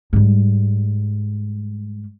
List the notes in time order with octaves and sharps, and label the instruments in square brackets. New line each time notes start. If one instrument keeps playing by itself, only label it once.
[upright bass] G#2 G3